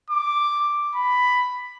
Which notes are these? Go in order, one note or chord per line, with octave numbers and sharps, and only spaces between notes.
D6
B5